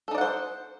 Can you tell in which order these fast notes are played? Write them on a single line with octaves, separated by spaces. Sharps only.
A4 D#4 D5 F#5 C5